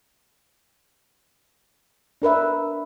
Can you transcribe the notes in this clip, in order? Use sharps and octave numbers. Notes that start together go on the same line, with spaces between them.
D4 A#4 B4 E5